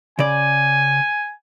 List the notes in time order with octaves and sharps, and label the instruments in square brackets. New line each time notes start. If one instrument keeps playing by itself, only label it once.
[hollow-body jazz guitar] C#3 D5 [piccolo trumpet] G#5